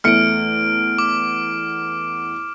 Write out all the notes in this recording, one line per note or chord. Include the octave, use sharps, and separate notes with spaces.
E2 A3 F6 C#7 D7
D6